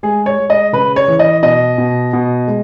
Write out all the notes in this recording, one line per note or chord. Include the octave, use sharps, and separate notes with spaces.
G#3 G#4
C#5
G#3
D#5
C#3 B4
C#5
E3
D#5
B2 D#5
B2
B2
G#3